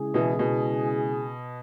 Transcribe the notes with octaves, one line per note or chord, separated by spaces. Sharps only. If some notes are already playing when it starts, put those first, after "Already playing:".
Already playing: C#3 G#3 E4 G#4
B2 E3
B2